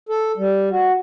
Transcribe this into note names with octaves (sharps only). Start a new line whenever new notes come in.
A4
G3
F#4